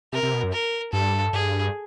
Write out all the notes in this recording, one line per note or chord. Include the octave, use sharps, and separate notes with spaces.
C3 A#4
C3
B2
F#2
A#4
G2 A4
G2 G#4